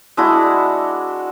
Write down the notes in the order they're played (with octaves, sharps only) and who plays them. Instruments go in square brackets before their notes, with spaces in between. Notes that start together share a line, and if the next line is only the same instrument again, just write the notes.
[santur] G#3 D4 E4 F#4